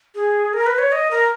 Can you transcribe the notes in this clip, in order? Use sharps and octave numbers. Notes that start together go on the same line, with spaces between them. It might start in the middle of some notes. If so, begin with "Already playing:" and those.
G#4
A#4
B4
C#5
D#5
A#4